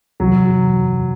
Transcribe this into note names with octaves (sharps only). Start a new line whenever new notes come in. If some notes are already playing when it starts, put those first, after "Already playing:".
C#2 C3 E3 F#3